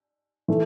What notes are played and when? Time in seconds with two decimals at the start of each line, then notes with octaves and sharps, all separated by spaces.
0.48 E3 A3